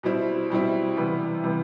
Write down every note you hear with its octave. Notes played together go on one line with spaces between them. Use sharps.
B2 G3 C4 E4
B2 G3 C4 E4
C3 E3 G3 B3
C3 E3 G3 B3